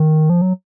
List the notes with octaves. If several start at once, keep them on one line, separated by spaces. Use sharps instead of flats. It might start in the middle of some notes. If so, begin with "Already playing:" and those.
Already playing: D#3
F3
F#3